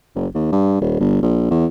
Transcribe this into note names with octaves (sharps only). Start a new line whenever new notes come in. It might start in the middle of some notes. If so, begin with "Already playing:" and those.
F#1
D#2
G2
D#1
G1
A#1
E2